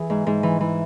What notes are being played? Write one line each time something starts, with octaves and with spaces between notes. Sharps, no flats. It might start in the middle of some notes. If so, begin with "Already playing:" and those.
Already playing: E3 G#4
G#2
G#2
E3
E3